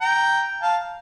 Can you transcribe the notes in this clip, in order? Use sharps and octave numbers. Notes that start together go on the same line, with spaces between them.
G5 A#5
F5 A5